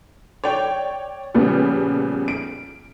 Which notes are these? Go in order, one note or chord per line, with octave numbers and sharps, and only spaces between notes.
C#5 D5 G5
A#2 C#3 F3 G3 B3
D7